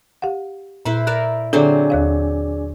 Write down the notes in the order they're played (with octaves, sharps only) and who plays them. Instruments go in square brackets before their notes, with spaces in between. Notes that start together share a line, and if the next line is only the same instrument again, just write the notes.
[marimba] G4 F5 F#5
[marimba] A#2 [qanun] E4 B4 C5
[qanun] A#4 D5 E5 [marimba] F#6
[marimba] D3 A4 [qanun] F#3 C4 C5 [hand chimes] D4 G#4 D5
[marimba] D#2 C#5 F5